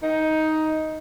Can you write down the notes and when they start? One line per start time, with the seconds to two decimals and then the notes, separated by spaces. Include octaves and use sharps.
0.03 D#4